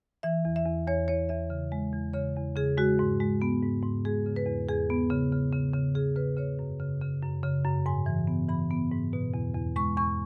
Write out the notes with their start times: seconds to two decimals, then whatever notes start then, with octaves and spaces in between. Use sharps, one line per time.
0.23 E3 E5
0.45 E2
0.56 E5
0.66 E2
0.87 E2 C#5
1.08 E2 C#5
1.29 E2 E5
1.50 C#3
1.72 G#3
1.93 E2
2.14 C#3 C#5
2.36 E2
2.56 C#3 G#4
2.78 G#3 F#4
2.99 G#2
3.20 G#3
3.42 B3
3.63 G#2
3.83 G#2
4.05 G#3 G#4
4.26 C#3
4.36 B4
4.47 E2
4.69 E2 G#4
4.90 B3
5.10 C#3
5.32 C#3
5.52 C#3
5.74 C#3
5.95 C#3 G#4
6.16 C#3 B4
6.37 C#3 C#5
6.59 F#2
6.80 C#3
7.01 C#3
7.22 F#2
7.44 C#3
7.65 F#2
7.86 G#2 G#5
8.06 E3
8.27 B3
8.49 E3 B5
8.71 B3
8.92 G#2
9.13 B2
9.34 E2
9.54 E2
9.76 G#3 C#6
9.97 E2 C#6